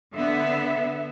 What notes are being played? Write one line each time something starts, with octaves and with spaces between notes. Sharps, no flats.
D3 B3 E5